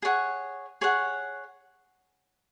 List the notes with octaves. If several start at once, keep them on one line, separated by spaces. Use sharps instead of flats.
G#4 C#5 F#5
G#4 C#5 F#5